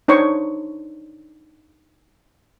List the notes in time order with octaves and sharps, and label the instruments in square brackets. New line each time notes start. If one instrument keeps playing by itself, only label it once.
[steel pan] D4 D#4 C5 C#5 C#6